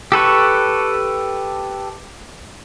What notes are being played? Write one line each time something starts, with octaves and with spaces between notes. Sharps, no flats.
G4 A4 B4 C#6